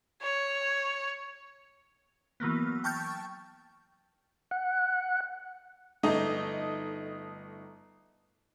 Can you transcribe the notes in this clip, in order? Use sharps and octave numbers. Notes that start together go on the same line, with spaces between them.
C#5
E3 F#3 A#3 B3
G5 A5 C#6 F6 G6 A6
F#5
G1 A3 D#4 D#5